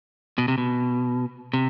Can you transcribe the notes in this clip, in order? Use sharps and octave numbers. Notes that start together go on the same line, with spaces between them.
B2
C3
B2
C3